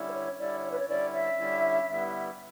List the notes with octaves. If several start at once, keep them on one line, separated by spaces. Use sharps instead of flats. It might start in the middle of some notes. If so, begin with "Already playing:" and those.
Already playing: D3 G3 C#4 E4
B4
C#5
D3 G3 C#4 E4 D5
C#5
B4
C#5
D3 G3 C#4 E4 D5
E5
D3 G3 C#4 E4
G2 D3 G3 B3 E4